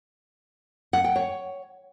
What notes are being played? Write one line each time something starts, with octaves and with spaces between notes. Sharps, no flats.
F#5
G5
C#5